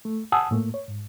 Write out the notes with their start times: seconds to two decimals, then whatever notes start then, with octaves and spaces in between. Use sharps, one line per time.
0.05 A3
0.32 F#5 G#5 A5 D#6 E6
0.51 A2 A3 A#3
0.74 C#5
0.88 G#2